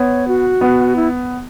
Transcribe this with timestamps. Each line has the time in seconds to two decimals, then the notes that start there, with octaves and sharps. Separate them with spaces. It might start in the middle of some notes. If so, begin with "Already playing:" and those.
Already playing: B3 C#5
0.28 F#4
0.61 B3
0.96 E4